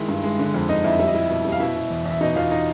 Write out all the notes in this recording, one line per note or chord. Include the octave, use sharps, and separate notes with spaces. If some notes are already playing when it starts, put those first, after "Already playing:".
Already playing: D#3 G#3 E4 E5
G2
G#3
D3
F2
D3 D#4 D#5
F2 E4 E5
G3 E5
D#5
G3 E4 E5
B2
G3
F5
B2 E4 E5
B2
E2
E2 E5
B2 D#4 D#5
E2 F4 F5
D#4 D#5